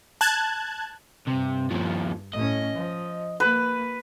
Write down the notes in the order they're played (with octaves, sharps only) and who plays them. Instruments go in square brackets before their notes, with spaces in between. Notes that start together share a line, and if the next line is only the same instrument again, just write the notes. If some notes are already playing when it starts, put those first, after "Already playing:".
[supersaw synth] A5 F#6 G#6
[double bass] G2 [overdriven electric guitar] C3
[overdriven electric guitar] D#2 F3
[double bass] A2 C#4 [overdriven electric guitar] D#5
[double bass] F3
[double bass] A#3 [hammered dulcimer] B4